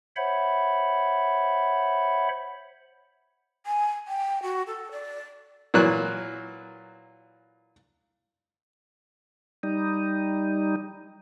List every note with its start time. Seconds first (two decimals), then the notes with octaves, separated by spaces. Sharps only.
0.16 C5 C#5 E5 F#5 B5
3.66 G#5
4.08 G5
4.43 F#4
4.67 A4
4.92 D5
5.74 A#2 E3 F#3 F#6
9.63 G3 D#4